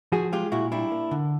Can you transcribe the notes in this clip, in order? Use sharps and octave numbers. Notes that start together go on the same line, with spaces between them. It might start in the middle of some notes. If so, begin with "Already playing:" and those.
F3 F#4 G#4
G#3 F4 G4
A#2 E4 F#4
G3 D4 E4
A#3
D3